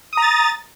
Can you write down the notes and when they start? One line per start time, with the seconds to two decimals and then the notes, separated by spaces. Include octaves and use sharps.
0.13 D#6
0.17 A#5
0.22 A6